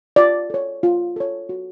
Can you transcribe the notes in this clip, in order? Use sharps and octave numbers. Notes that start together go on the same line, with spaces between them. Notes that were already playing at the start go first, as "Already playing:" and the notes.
F4 D5
A4 C#5
F4
A4 C#5
F#4